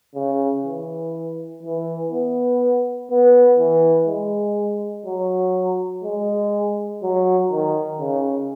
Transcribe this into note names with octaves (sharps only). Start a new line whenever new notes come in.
C#3
E3
E3
B3
B3
E3
G#3
F#3
G#3
F#3
D#3
C#3